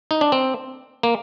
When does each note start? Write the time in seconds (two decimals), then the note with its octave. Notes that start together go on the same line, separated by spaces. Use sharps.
0.11 D#4
0.21 D4
0.32 C4
1.03 A#3